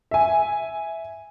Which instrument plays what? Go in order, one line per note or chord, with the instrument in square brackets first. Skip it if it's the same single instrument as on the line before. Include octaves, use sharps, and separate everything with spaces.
[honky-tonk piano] E5 G#5